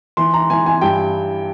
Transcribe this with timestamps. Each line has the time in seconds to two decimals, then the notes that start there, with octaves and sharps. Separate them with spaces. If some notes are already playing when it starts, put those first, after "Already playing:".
0.17 E3 C6
0.34 A#5
0.50 E3 G#5
0.66 G#5
0.81 G2 G5